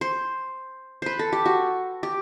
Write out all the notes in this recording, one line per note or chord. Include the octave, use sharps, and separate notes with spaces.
C5
B4 C5
A4
G4
F#4
G4